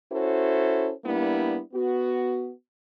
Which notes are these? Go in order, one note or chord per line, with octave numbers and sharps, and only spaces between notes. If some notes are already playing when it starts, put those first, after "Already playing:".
C#4 E4 F#4 A4 C5
G3 A#3 B3 D4 E4
B3 F#4